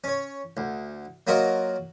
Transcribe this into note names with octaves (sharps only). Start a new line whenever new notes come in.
C#4 C#5
D2
F#3 A#3 F4 F#4 A#4 D#5